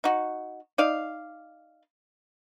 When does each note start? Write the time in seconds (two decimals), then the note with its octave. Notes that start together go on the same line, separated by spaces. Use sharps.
0.04 D#4 F#4
0.78 D#4 D5 F5